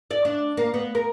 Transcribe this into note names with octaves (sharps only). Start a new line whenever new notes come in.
D5
D4
A#3
B3
A#4